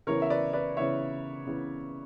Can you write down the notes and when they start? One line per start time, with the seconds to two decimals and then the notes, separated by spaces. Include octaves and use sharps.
0.07 C#3 E3 B3 A#4 C#5
0.22 E5
0.30 B4 D5
0.53 B4 D5
0.77 C#3 E3 B3 C#5 E5
1.47 C#3 E3 B3